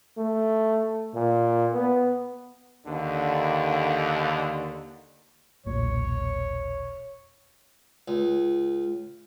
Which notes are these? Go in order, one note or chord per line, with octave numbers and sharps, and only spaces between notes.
A3
A#2
B3
D#2 D3
E1 B1 A#2 C#5
C#2